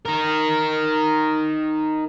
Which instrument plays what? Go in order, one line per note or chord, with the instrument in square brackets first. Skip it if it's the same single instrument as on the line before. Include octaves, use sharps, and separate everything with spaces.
[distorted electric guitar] D#4 A#4